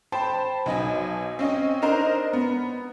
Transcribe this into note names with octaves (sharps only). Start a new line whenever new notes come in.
C5 G5 A5 B5
B1 D#4 D#5 G#5
C4 C#4 D#5
D4 D#4 A#4 C5 D#5
B3